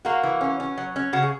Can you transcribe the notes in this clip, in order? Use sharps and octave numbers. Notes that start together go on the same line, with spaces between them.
A#3 F#4
E3
C#4
C#4
F#3
C#4
C#3 F#4
G#4